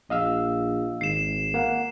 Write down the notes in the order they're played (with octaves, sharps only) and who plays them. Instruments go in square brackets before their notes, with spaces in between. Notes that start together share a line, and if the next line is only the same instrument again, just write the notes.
[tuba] A#1 [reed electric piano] D#5 F5 E6
[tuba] G#1 [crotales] C7 E7
[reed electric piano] A#3 F#5